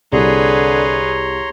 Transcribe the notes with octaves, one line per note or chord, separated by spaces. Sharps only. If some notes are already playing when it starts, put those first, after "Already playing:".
C2 D3 G#4 B4 C#5 A#5 C6